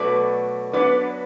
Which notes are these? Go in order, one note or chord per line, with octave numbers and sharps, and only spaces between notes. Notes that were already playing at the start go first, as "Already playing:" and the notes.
Already playing: B2 F#3 A3 B4 D5
A2 F#3 B3 D4 B4 D5